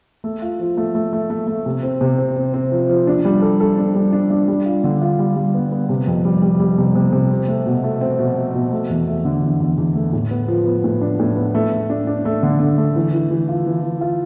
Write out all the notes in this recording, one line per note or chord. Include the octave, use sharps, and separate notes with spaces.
A3
F4
F3
A3
A3
A3
A3
A3
C3
C4
C3
C4
C4
C4
F3
F3
D4
G3
A4
A4
D4
G3
D4
D4
G3
F4
D3
F4
G3
G3
B3
B3
C3
F2
G3
G3
G3
C3
C3
C3
C4
A3
B2
A3
C4
B2
B2
B2
A3
E2
A3
D3
E2
E2
E2
A3
A2
B3
F3
B3
A2
D4
A2
B3
A3
A3
D4
D4
A3
D3
D3
A3
E3
E3
E3
F4
E3
E3
F4